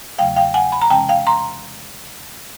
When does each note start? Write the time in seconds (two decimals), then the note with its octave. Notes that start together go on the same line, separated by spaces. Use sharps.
0.19 E2 C#3 F#3 A3 F5 G5
0.36 F5 G5
0.54 F#5 G#5
0.72 B5
0.82 A#5
0.90 C3 E3 G#3 C#4 G5 A5
1.09 F5 G5
1.27 A#5 C6